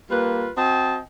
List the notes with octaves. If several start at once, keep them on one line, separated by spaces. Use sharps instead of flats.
G3 A#3 F4 B4
C4 F#4 D#5 G5 A5